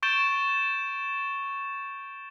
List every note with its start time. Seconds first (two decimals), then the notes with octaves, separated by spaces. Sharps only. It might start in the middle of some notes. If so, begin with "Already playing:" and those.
0.03 C#6 G6 A6 D7 E7 G7